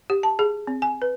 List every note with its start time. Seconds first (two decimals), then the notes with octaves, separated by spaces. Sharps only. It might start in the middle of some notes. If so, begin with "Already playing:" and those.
0.10 G4
0.23 A5
0.39 G#4
0.67 C4
0.82 G#5
1.02 B4